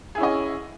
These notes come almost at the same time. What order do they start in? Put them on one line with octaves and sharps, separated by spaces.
G#4 E4 C#4 D#5